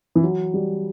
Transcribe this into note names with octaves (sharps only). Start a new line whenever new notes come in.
E3
F#3
G3